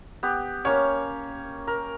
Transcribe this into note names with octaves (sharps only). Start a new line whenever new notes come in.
B3 G4
A#3 C#4 C#5
A#4